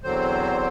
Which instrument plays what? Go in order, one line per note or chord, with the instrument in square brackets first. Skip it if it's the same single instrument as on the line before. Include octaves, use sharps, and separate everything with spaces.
[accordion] E2 D3 F#3 C4 C5